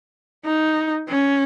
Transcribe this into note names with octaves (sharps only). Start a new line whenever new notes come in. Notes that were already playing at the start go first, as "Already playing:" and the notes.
D#4
C#4